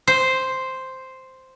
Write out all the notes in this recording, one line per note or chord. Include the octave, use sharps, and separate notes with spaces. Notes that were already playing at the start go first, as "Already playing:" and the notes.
C5